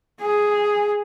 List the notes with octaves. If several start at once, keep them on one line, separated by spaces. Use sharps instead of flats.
G#4